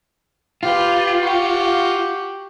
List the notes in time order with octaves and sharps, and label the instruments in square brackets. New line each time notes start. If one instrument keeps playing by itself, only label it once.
[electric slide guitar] F4 [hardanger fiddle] G4 B4
[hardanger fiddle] F#4 G4